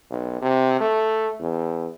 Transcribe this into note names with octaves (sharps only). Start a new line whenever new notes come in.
B1
C3
A3
E2